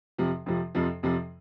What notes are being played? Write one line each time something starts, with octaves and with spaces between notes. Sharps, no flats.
F2 C3 F3
F2 C3 F3
F2 C3 F3
F2 C3 F3